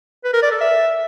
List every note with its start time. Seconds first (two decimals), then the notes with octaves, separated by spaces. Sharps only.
0.24 B4
0.33 A#4
0.42 D5
0.51 A4
0.61 E5